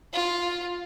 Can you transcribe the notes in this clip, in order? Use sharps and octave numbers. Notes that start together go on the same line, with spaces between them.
F4